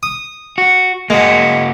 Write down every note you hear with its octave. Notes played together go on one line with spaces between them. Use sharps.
D#6
F#4
G#3 A#3 F#4